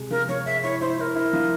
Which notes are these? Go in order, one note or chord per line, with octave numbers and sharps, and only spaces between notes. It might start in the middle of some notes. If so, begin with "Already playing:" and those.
Already playing: C3 G#3
F3 A#4
F3 C#5
G#3 E5
E4 C#5
E4 C5
E4 A#4 C5
E4
F3